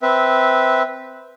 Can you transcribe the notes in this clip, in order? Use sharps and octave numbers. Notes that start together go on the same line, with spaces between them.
C4 B4 E5